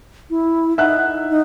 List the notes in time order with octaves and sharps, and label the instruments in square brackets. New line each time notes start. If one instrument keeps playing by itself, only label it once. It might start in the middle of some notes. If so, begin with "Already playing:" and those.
[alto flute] E4
[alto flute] D#4 [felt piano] E5 F#5 F#6
[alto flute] D#4